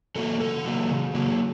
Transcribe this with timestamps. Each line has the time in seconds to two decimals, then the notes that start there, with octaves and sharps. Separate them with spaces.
0.16 F#3 A#3 A4
0.40 C#3 A4
0.65 F#3 A#3
0.90 C#3
1.15 F#3 A#3